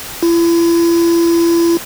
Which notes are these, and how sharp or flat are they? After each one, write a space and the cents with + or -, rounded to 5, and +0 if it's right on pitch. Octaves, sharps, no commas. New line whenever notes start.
E4 +40